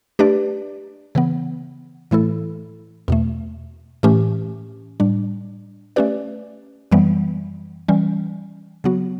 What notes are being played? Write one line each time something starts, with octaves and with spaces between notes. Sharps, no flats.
A3 D4 G4 B4 D5
C#3 E3 B3
A2 E3 A3 E4 A4
E2 B2 A3
A2 E3 A3 C#4 G4
A2 G3 D4
A3 C#4 G4 B4 D5
F#2 E3 G3 B3
E3 G3 C#4
C#3 F#3 B3 F#4